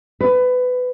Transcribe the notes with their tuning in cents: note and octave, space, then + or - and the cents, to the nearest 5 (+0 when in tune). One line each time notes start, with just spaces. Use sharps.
B4 +20